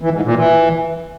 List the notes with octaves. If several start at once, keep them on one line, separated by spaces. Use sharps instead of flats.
E3
G#2
A#2
E3